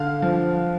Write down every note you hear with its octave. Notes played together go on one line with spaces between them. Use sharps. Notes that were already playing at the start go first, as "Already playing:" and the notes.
Already playing: D3 F5
F3